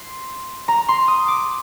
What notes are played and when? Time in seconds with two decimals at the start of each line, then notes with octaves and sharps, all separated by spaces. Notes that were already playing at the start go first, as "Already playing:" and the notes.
Already playing: C6
0.68 A#5
0.88 C6
1.08 D#6
1.28 D6